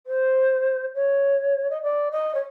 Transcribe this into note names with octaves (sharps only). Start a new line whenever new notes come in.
C5
C#5
D#5
D5
D#5
C#5